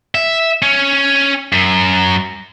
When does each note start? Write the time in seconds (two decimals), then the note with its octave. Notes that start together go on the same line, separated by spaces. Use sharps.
0.15 E5
0.62 C#4
1.53 F#2